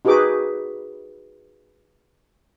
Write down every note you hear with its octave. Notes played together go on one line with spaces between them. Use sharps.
D#4 F#4 G#4 B4 D6